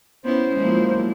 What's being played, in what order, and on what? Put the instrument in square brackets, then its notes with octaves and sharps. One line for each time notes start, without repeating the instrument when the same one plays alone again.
[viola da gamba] B3 C#4 E4 [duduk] C5
[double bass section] F3 F#3 A#3 [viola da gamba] G#3 E4